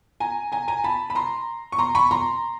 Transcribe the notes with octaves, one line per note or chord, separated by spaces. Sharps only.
G#5 A#5
G#5 A#5
G#5 A#5
A5 B5
B5
A#5 C6
C#6
A#5 C6
B5 C#6
A#5 C6